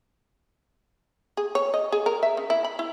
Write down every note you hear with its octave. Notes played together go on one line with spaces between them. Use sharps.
G#4
C#5
D#5
G#4
A#4
E5
C#3
E4
B5
E4